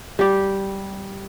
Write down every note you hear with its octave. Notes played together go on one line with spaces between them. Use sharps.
G3 G4